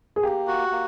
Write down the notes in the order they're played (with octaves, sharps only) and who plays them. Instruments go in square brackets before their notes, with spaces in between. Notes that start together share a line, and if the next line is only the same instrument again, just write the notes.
[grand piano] G#4
[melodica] A#3 [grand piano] G4
[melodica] F#4
A#3